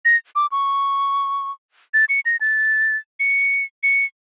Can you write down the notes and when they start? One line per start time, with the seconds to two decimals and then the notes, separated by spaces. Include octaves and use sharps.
0.05 A#6
0.35 D6
0.52 C#6
1.94 A6
2.09 C#7
2.26 A#6
2.41 A6
3.20 C#7
3.83 C#7